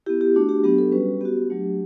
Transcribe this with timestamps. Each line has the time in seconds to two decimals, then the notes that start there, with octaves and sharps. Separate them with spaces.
0.06 B3 E4 G4
0.21 G4
0.35 A3 D4 F#4
0.49 G4
0.63 F#3 B3 D4 G4
0.78 A4
0.92 G3 C#4 F#4 B4
1.21 B3 F#4 G4
1.50 F#3 A3 D4